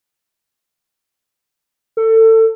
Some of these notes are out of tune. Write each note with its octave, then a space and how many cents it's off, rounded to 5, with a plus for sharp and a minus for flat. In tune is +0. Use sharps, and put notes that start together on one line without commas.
A4 +25